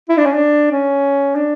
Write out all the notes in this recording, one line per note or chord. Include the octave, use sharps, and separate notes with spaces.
E4
D4
C#4
D4
C#4
D4